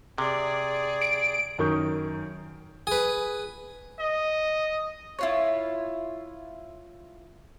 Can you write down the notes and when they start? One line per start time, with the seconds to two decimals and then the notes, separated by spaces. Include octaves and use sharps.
0.18 C3 G#4 D5
1.02 D7
1.58 F#2 D#3 A#4 C#6 D#6 G6
2.87 G#4 B4
4.00 D#5
5.19 E4 F4 C#5